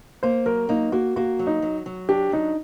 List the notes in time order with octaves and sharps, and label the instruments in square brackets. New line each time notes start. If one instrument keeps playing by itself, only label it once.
[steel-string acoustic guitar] A#3 [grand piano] C5
[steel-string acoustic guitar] F#3 [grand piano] A#4
[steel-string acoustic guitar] A#3 [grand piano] D#4
[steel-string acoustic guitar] A#3 [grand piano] F#4
[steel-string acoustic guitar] A#3 [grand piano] F#4
[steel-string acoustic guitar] F#3
[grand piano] D#4
[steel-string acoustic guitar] F#3
F#3
[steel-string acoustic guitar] D4 [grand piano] G4
[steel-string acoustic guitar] F#3 [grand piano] D#4